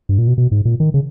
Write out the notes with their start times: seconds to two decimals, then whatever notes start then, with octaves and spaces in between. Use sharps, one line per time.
0.09 G2
0.18 A#2
0.27 B2
0.38 B2
0.51 G#2
0.65 A#2
0.80 D#3
0.94 C#3